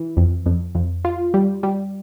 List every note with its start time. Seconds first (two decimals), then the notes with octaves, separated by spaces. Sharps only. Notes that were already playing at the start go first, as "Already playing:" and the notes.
Already playing: E3
0.17 F2
0.46 F2
0.75 F2
1.05 F4
1.34 G3
1.63 G3